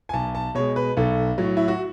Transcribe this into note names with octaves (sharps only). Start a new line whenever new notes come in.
G#5
B1 A5
A5
B2 G#3 C#5
B4
B1 A4
A2 F#3
E4
F#4